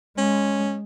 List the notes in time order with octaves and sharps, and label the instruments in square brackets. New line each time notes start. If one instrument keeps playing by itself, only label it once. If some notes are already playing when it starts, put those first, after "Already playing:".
[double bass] G#3 [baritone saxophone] C#4